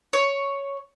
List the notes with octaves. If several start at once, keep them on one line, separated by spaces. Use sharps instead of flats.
C#5